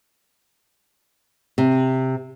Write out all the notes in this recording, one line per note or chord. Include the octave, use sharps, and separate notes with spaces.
C3